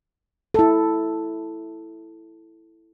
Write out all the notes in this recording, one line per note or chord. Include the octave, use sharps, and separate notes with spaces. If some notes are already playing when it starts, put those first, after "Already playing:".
E4 A4